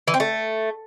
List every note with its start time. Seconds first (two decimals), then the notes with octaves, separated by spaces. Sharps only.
0.08 E3
0.14 C4
0.20 A3